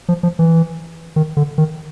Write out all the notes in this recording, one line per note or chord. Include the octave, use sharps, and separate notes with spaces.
F3
F3
E3
D#3
D3
D#3